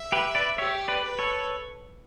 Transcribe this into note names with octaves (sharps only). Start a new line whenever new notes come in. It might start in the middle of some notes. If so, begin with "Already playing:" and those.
Already playing: E5
G4 B4
B4 D5
G4 C#5 E5
B4 D5
B4
A4 C#5